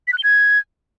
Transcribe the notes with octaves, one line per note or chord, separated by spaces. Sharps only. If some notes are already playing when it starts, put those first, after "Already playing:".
B6
F#6
G7
G#6